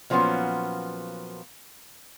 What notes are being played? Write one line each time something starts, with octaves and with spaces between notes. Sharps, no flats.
A#2 F3 F#3 A#3 B3 C#4